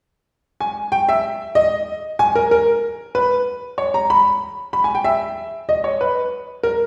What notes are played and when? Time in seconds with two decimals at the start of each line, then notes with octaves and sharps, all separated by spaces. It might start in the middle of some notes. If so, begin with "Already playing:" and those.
0.60 G#5
0.92 G5
1.09 E5
1.55 D#5
2.19 G#5
2.35 A#4
2.51 A#4
3.15 B4
3.78 C#5
3.94 A#5
4.10 B5
4.73 B5
4.84 G#5
4.95 G5
5.04 E5
5.69 D#5
5.84 C#5
6.01 B4
6.63 A#4